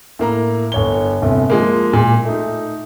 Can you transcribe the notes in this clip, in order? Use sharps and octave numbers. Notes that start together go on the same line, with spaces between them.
A2 A#3 A#5
G1 C#5 G7
G1 C2
F3 G#3 A#3
A#2
A3 D#4